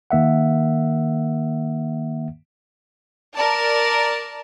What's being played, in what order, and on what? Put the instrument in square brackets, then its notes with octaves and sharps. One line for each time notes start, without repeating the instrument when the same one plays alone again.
[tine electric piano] D#3 A#3 E5 F#5
[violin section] A#4 D5 A5